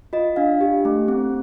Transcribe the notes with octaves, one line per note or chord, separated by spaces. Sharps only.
F4 D#5
D4 F5
G4
A3
C4